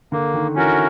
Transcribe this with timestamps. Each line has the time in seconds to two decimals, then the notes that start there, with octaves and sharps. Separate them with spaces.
0.12 D3 A#3
0.34 D#3
0.55 E3 C#4 F#4 A#4